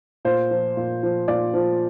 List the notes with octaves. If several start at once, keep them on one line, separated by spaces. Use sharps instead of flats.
A#2 C5
F3
A#2
F3
A#2 D5
F3